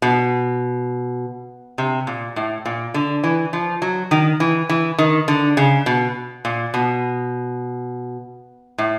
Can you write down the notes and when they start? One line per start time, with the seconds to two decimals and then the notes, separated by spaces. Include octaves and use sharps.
0.02 B2
1.78 C3
2.07 A#2
2.36 A2
2.65 A#2
2.94 D3
3.24 E3
3.53 F3
3.82 F#3
4.11 D#3
4.40 E3
4.69 E3
4.98 D#3
5.28 D3
5.57 C#3
5.86 B2
6.45 A#2
6.74 B2
8.78 A2